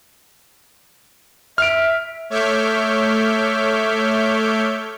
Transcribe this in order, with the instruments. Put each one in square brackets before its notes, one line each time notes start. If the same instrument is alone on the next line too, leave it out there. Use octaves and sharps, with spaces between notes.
[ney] E5 [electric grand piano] F6 D7
[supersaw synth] A3 C#5 E5 D6 F6 G6